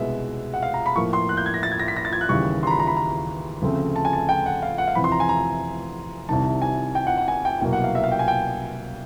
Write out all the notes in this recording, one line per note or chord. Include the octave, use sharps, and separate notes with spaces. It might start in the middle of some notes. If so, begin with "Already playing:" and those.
Already playing: C2 B2 G#3 B3 E5
F#5
F5
A#5
B5
A2 F3 A#3 C#6
C6
F#6
G6
G#6
A#6
A6
G#6
A#6
B6
A#6
A6
G#6
F#6
D#2 C#3 E3 G3 C#6
C6
A#5
B5
A#5
B5
A#5
D2 C#3 F3 A3 C4
A5
G#5
A5
G5
F#5
F5
F#5
F5
F2 C3 E3 B5
C6
A#5
G#5
A#5
C2 C3 D#3 A5
G#5
G5
F#5
F#5
G#5
G5
C2 B2 F#3 A#3 G5
F#5
F5
E5
F5
G5
G#5
G5